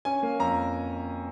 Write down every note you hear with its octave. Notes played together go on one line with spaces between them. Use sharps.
C#4 G#5
A#3
F2 A#5